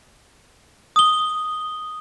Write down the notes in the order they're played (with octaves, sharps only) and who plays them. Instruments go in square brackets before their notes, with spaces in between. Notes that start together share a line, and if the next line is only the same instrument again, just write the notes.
[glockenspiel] D#6 G7